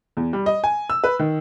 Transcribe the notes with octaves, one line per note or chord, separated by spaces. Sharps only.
E2
G3
D#5
G#5
E6
B4
D#3